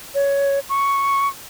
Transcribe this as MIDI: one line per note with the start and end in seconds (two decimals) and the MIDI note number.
0.15 0.59 73
0.70 1.28 85